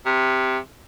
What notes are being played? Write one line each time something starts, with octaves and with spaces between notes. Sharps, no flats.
C3